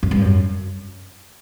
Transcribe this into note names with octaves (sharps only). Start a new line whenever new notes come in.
F#2
G2
F#2